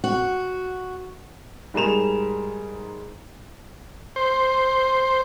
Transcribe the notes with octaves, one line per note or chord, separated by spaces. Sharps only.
F#4
G#2 G3 G#4 A#4 E7 F7
C5